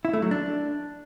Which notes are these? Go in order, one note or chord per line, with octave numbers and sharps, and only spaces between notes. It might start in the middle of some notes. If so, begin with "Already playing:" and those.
E4
A3
F#3
D4